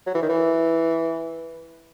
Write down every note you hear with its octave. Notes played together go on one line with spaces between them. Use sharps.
F#3
E3
D#3
E3